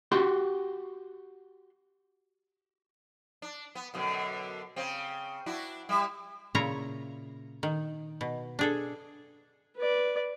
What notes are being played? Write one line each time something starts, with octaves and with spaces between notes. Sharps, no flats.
F#4 G4 C6
D4
B3
F#2 B2 D3
C#3 C4
D4 E4 F#4
G3 E5
A#2 C#3 E4 F4 C#5 A#5
D#3
B2
D4 G#4 A4
B4 D5